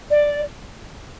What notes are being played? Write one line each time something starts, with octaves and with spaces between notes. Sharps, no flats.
D5